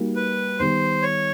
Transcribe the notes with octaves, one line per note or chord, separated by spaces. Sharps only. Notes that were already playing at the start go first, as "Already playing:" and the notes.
Already playing: G3 A#3 D#4 F#4
B4
D#3 G3 B3 D#4 C5
C#5